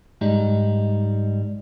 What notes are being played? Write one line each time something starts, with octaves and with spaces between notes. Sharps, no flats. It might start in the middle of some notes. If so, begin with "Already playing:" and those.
G#2 G3 D#4